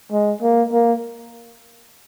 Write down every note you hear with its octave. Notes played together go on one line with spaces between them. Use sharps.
G#3
A#3
A#3